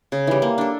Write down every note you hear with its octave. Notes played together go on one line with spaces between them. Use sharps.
C#3
E3 G3
A#3
D4 A4